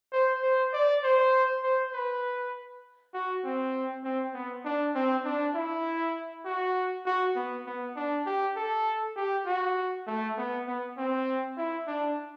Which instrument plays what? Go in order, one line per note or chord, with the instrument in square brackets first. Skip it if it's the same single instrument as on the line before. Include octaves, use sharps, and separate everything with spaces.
[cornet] C5
C5
D5
C5
C5
B4
F#4
C4
C4
B3
D4
C4
D4
E4
F#4
F#4
B3
B3
D4
G4
A4
G4
F#4
A3
B3
B3
C4
E4
D4